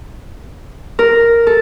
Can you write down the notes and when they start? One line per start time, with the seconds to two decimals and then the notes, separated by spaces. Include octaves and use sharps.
0.99 A#4
1.47 A4